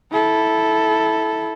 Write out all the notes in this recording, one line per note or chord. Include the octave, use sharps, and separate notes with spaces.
E4 A4